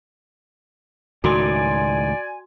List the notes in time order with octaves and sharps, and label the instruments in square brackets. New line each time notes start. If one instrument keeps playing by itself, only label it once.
[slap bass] C#2 A2 D#3 [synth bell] F#4 C6 [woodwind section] D5 G#5